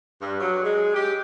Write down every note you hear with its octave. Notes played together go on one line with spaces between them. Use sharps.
G2
F#3
G#3
G4